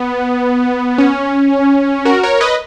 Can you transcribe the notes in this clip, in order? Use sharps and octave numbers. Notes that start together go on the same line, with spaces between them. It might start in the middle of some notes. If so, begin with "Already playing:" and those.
Already playing: B3
C#4
F#4 A#4
A#4 C#5
B4 D#5